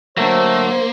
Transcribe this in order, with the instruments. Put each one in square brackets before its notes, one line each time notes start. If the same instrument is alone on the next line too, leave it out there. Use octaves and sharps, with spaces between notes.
[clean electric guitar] D2 F#3 [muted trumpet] A3 [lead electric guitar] A#3 [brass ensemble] C5